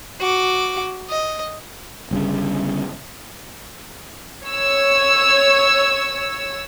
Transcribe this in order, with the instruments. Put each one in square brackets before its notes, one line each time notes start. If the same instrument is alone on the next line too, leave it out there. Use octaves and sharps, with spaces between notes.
[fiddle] F#4 D6
D#5
[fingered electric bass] G1 G2 A#2 C#3
[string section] C#5 E6